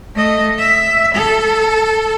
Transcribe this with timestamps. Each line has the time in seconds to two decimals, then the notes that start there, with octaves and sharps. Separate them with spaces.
0.15 A3 D#5
0.59 E5
1.15 A4